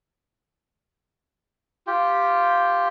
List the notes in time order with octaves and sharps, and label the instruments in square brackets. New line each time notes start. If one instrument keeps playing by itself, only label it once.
[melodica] F4 G4 G5